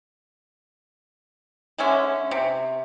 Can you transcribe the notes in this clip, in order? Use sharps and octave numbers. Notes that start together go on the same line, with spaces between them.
D3 G#3 C#4 E5
C3